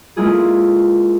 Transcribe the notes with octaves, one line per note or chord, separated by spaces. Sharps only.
G#3 A#3 E4 F4 G#4 A4